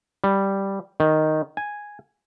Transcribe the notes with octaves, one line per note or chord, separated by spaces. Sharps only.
G3
D#3
G#5